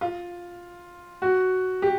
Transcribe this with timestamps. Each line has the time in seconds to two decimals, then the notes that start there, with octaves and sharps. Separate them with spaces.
0.01 F4
1.22 F#4
1.82 G4